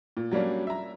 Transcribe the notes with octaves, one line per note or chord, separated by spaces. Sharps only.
A#2
F#3 G3 A#3 C#4 D4
E5 A#5